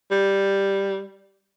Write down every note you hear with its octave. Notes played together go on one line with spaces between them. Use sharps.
G3